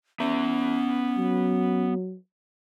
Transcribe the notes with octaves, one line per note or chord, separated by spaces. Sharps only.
B3 C#4 E5
F#3